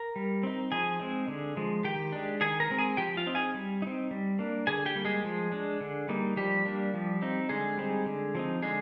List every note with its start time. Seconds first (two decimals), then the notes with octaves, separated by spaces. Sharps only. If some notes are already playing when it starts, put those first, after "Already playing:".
Already playing: A#4 A#5
0.16 G3
0.43 C4 D#4
0.72 F3 G#4 G#5
0.99 G#3 C4 D#4
1.28 D3
1.57 F3 G#3
1.84 D#3 G4 G5
2.12 G#3 D4
2.41 D#3 G#4 G#5
2.60 A#4 A#5
2.70 G#3 C4
2.79 G#4 G#5
2.97 F3 G4 G5
3.17 F4 F5
3.27 C4 D#4
3.35 G#4 G#5
3.54 G3
3.82 C4 D#4
4.11 G3
4.39 A#3 D4
4.67 D3 G#4 G#5
4.86 G4 G5
4.95 G3 A#3
5.05 G#3 G#4
5.24 F3
5.52 G#3 D4
5.81 D3
6.09 G3 A#3 D#4
6.37 F3 G3 G4
6.65 A#3 D4
6.94 F3
7.22 C4 D#4
7.49 D3 G#3 G#4
7.78 G3 C4 D#4
8.06 D3
8.35 F3 C4 D#4
8.62 D3 G#3 G#4